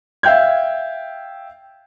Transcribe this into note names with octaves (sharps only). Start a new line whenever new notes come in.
E5 F5 G5 G6 G#6